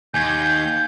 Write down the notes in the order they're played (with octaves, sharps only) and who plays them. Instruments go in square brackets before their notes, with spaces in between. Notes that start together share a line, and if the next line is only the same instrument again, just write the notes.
[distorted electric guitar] D#2 [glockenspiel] G#5 G#6 [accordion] G6